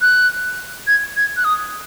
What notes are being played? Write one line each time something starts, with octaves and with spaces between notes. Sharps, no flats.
F#6
G#6
G#6
F#6
D#6